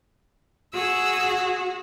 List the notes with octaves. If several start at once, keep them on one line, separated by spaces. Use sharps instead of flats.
F#4 G#4 E6